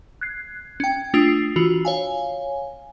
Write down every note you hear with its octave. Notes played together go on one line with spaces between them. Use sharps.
F#6 G#6 C7
C#4 G5
A3 D4 F4 D#6 C7
E3 F4 F#4
C#5 F5 G#5